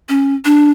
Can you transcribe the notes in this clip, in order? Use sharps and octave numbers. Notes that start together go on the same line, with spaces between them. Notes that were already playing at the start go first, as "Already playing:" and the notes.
C#4
D4